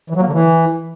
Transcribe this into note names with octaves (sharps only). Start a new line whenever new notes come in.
E3
F#3
A#3
D3
E3